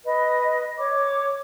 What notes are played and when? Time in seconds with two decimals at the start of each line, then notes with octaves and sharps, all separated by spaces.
0.04 B4 D#5
0.77 C#5 D6